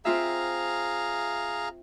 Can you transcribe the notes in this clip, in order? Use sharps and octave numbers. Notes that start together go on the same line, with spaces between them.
C4 F4 G#4 E5 F5 A#5